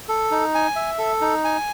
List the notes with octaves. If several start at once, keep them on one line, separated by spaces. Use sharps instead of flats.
A4
D#4
G#5
E5
A4
D#4
G#5